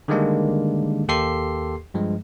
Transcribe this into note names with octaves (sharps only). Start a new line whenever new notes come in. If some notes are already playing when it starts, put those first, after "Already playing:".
D3 D#3 G3 G#3 A#3 D4
D#2 A#3 G4 A4 C6 C7
G2 F3 G#3